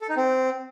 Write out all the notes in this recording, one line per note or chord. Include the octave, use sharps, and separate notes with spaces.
A4
D#4
C4